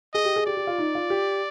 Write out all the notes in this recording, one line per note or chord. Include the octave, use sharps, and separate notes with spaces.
G#4 D#5
G4
G#4
G4 D5
G4
F4
D#4
F4
G4